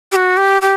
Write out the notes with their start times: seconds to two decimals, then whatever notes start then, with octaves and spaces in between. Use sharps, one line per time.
0.12 G4
0.16 F#4
0.37 G4
0.62 G4